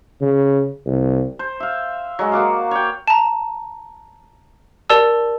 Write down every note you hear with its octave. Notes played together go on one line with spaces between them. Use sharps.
C#3
C2
C5
E5 F5
F#3 G#3 F#4
A#3 F#4 D5 F5
C#5 D5 G5
A5 A#5
G4 A#4 D5 A5 E6